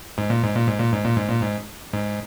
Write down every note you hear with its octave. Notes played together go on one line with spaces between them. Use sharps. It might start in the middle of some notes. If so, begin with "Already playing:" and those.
G#2
A#2
G#2
A#2
G#2
A#2
G#2
A#2
G#2
A#2
G#2
G#2